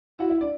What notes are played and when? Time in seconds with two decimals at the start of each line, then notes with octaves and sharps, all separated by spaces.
0.19 E4 F#4 F#5
0.30 E4 E5
0.41 D4 D5